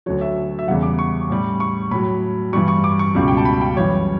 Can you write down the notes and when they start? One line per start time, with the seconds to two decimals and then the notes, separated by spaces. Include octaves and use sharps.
0.06 D2 D3 F#3 C#5
0.21 E5
0.59 E5
0.68 E2 C#3 G3 F#5
0.83 D6
0.99 C#6
1.30 A2 G3
1.60 C#6
1.91 A2 F#3 B5
2.53 G2 E3 G3 C#6
2.68 C#6
2.84 D6
2.99 C#6
3.15 C#2 B2 G3
3.28 G5
3.37 A5
3.45 B5
3.61 G5
3.77 F#2 E3 G3 C#5